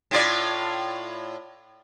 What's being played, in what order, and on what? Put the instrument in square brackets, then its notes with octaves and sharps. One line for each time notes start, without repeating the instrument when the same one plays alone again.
[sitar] A2 F4 D5